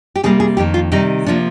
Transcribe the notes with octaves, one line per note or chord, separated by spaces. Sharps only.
G4
C3 G3 A#3 G#4
G#4
F2 D#3 A#3 G4
F4
C3 D#3 G3 D#4
C3 F3 A#3 D4